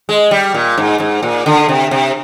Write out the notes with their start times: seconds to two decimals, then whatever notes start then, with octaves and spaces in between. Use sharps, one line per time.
0.09 G#3
0.31 G3
0.54 A#2
0.78 G#2
1.00 G#2
1.23 A#2
1.46 D3
1.69 C3
1.91 C3